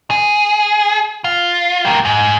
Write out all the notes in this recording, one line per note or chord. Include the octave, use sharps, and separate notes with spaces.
G#4
F4
G3 A#3
G#2